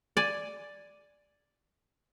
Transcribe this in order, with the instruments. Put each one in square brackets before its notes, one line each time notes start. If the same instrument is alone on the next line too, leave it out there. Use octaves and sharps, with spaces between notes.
[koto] D5 G#5